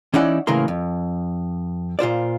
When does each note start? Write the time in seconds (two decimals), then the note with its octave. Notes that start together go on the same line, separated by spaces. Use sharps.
0.14 E3 C#4 D#4 E4 D5 F#5
0.47 A2 C#3 E3 A#3 A#4 C6
0.68 F2
1.99 A#2 F4 C5 D5